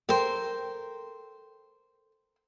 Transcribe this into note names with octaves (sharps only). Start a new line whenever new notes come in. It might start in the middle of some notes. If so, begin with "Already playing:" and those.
A4 A#4 C5 G5